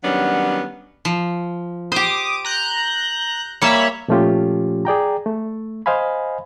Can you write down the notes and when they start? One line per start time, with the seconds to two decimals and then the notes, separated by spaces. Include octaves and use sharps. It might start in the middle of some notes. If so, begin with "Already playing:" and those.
0.04 D#3 F#3 G3 B3 C#4 D4
1.05 F3
1.92 G4 C5 D6 D#6
2.45 A#5 F#6 G6
3.62 G3 A#3 C#5 E5 B5
4.08 A#2 F3 A3 C#4 F4 G4
4.85 G#4 D5 G5 A#5
5.26 A3
5.86 C5 D#5 F5 G#5 B5